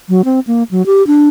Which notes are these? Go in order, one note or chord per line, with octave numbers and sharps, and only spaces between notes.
F#3
C4
A#3
F#3
G4
D4